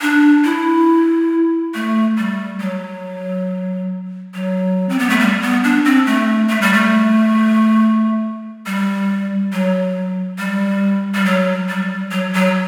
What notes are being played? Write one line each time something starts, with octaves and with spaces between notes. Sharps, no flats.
D4
E4
A3
G3
F#3
F#3
C4
B3
A3
G3
B3
D4
C4
A3
A3
G3
A3
G3
F#3
G3
G3
F#3
G3
F#3
F#3